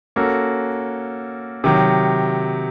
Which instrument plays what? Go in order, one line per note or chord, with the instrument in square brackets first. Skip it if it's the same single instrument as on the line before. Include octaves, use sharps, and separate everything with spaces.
[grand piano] A#3 C#4 F#4 A4
C3 D#3 F#3